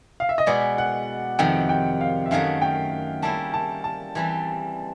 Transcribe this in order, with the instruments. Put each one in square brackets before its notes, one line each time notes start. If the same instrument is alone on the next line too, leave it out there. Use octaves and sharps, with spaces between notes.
[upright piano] F5
E5
D#5
[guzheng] B2 G#3 B3 [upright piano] D5
[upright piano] F#5
[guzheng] F2 C3 D#3 [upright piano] G5
[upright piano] G5
F5
E5
[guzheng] F#2 D#3 F#3 A3 [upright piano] F5
[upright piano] G5
[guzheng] G3 A#3 C#4 E4 [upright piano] A5
[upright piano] A5
A5
[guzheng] E3 G3 C4